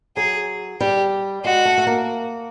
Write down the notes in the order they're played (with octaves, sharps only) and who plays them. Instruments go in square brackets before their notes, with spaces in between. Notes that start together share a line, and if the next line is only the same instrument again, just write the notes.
[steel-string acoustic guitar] F#3 [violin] G#4
[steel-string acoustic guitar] G3 [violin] G4
[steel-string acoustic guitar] G#3 [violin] F#4
[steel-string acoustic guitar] A3
A3
A#3